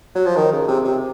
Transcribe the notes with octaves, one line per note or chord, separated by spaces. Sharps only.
F#3
F3
D#3
C#3
C3
C3